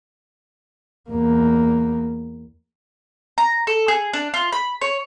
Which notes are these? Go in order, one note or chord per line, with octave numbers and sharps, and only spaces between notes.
E2 A#3
A#5
A4
G#4
D4
F4
B5
C#5